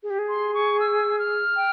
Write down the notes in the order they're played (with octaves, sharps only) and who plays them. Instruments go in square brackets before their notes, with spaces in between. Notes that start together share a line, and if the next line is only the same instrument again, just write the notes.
[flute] G#4
G4
G#4
[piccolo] C6
C#6
E6
F6
[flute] G5